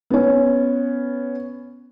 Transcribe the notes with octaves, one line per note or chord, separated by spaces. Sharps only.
B3 C#4